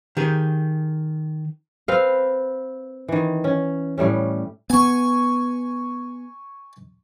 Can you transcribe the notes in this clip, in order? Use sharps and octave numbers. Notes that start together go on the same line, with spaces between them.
D#3 G4 G#4
C4 B4 F5
D#3 E3
C#4
A2 G3 A3 C#4
B3 G#5 C#6